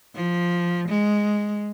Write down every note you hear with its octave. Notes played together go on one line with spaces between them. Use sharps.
F3
G#3